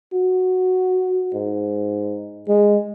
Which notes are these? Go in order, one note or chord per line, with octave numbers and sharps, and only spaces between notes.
F#4
G#2
G#3